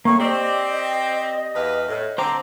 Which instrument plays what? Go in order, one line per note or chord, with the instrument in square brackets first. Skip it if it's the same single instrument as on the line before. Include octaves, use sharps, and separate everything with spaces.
[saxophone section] A2 [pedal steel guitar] A#3 [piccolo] C#6
[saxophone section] C4 [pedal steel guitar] G4 D5 [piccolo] D#5
[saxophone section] E2 B4 F5
A2
[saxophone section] D3 C4 [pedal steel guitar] C5 A#5 D6